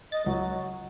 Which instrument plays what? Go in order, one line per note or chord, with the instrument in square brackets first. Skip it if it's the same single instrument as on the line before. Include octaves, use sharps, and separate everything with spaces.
[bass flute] D#5 [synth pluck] A6
[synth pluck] C#2 [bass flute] F#3